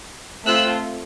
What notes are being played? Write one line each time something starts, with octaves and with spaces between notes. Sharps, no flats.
A3 C4 F4 E6 F#6